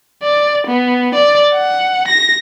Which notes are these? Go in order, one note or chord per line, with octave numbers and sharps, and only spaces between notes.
D5
B3
D5
F#5
A#6